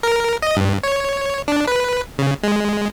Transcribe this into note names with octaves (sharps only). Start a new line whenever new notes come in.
A#4
D#5
G2
C#5
D4
B4
C#3
G#3